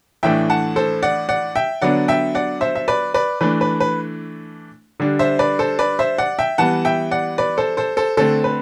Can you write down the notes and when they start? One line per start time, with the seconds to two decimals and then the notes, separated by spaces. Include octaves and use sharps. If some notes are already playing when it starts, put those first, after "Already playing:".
0.23 A2 E3 A3 D4 E5 G5
0.50 F#5 A5
0.76 A4 C5
1.03 D5 F#5
1.29 D5 F#5
1.56 E5 G5
1.82 D3 F#3 B3 D4 D5 F#5
2.08 E5 G5
2.35 D5 F#5
2.61 C5 E5
2.75 E5
2.88 B4 D5
3.14 B4 D5
3.41 E3 A3 D4 B4
3.61 B4
3.80 B4
5.00 D3 G3 D4
5.19 C5 E5
5.39 B4 D5
5.59 A4 C5
5.79 B4 D5
5.99 C5 E5
6.18 D5 F#5
6.39 E5 G5
6.58 E3 G3 B3 F#5 A5
6.85 E5 G5
7.11 D5 F#5
7.38 B4 D5
7.58 A4 C5
7.77 A4 C5
7.97 A4 C5
8.17 D3 A3 C4 A4 C5
8.44 B4